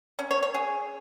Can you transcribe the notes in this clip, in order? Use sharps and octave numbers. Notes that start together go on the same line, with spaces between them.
C#4
C#5
C#5
G#4